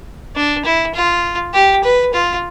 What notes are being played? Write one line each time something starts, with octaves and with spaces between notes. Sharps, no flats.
D4
E4
F4
G4
B4
F4